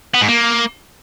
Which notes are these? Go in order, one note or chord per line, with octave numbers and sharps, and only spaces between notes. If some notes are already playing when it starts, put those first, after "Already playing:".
B3
G#2
A#3